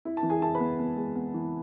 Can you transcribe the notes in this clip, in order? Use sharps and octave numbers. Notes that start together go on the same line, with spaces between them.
E4
A5
E3
G#4 G#5
E4 A5
B4 B5
B3
B3
G#3
B3
E3